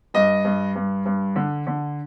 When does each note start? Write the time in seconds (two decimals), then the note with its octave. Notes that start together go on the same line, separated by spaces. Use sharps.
0.14 G2 D#5
0.45 G2
0.75 G2
1.06 G2
1.36 D3
1.67 D3